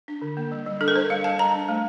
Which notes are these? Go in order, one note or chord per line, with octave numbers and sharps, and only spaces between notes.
D4
D3
A#3
G3
G3
D4 A4
A#4
D4 C5
G3 F5
G3 A5
G3 A#5
D4
A3